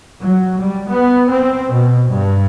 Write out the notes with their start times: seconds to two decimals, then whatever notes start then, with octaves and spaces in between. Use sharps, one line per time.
0.22 F#3
0.59 G3
0.89 B3
1.30 C4
1.71 B2
2.08 G2